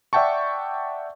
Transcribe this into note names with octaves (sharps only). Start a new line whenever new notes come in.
D5 E5 F#5 G5 A5 C#6